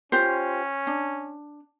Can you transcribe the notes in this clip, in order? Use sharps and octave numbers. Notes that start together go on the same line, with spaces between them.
C#4 F4 G4 C5
D4